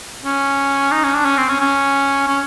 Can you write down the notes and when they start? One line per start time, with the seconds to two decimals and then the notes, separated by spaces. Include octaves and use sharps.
0.25 C#4
0.92 D#4
1.04 C#4
1.15 D4
1.26 C#4
1.37 C4
1.49 C#4
1.60 C#4
2.28 C#4